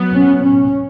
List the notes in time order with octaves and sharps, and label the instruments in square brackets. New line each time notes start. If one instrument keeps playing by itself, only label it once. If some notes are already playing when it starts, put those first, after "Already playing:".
Already playing: [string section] F#3 B3
[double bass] C#4
C#4